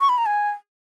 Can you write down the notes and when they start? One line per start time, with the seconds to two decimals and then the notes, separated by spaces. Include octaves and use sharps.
0.01 C#6
0.09 B5
0.18 A#5
0.26 G#5